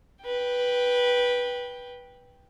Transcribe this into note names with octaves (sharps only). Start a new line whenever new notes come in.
B4 G5